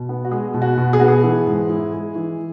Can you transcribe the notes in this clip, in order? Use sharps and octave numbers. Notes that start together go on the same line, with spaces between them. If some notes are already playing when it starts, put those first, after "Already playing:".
Already playing: B2
B3
F#4
G#3 G#4
B2
F#4
B2
G#4
B3 F#4
G#4
E3
G#2
E4
G#3
E3